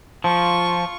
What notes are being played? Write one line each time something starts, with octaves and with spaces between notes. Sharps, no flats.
F3 F4 C#6